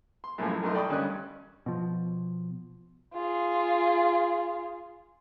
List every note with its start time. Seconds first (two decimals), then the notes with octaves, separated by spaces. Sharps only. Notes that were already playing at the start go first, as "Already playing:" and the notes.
0.24 C6
0.38 F#2 A2 C#3 E3 F3
0.51 F#2
0.63 B1 F#2 A3 D#4 A#4 C6
0.75 D5 G5 B5 C#6 D#6
0.89 D2 G2 C#4 D#5 F#6
1.66 B2 F3
3.14 F4 G#4